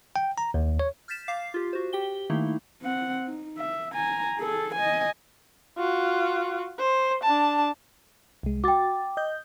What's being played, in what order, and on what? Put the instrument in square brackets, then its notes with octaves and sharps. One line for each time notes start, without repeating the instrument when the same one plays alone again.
[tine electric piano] G5
A#5
D#2
C#5
[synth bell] F6 G6 A6 B6 E7
F5 D6 C7
F4 G4
F#4 C5
G4 G5 G7
D#3 A3 A#3 D#4 E4
[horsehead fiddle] C4 F#5
D#4
E5
G#5 A#5
G#4 A4
D#5 G#5
[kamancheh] F4 F#4
C5
D4 A5
[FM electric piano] C2 G#3
[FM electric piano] F#4 A6 [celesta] G5 D6
[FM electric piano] D#5 G6